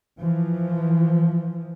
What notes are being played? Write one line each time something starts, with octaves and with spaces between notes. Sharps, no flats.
E3 F3